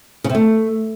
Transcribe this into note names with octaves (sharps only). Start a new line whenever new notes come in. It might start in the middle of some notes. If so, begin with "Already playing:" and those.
C#3
C3
A3